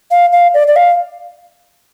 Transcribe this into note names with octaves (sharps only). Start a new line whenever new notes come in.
F5
F5
D5
D5
F5